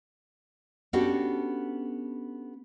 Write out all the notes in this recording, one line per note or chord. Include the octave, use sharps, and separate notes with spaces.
B3 C#4 D4 F#4 G4 A4